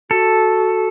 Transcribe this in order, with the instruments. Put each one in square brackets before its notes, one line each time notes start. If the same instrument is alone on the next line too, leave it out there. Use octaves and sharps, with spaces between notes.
[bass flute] F#4 [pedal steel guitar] A4